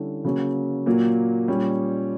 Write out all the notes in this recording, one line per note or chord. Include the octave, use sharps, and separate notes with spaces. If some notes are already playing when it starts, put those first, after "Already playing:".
Already playing: D3 G3 C#4 E4
C#3 F#3 A#3 C#4
A#2 F#3 A#3
A#2 G3 C#4